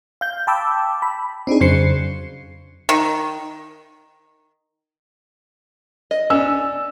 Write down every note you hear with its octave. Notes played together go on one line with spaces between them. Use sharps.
F5 G6
G5 A5 B5 D6 E6
B5
C4 D4 D#4 G#4
F2 C#3 F#3 C5 C7 C#7
D#3
D#5
C#4 D4 E6